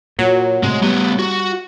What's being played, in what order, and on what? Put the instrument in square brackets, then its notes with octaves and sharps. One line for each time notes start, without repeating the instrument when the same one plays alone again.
[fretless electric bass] A#2 [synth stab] F#3
[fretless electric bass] A2 C3 [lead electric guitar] G#3
[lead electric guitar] A2 B3 [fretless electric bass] G3
[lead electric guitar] F#4